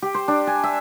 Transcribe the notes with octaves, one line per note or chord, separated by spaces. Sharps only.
G4
C5
D4
G#5
E5